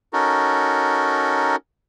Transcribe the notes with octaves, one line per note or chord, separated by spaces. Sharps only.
C#4 D#4 F#4 A4 A#4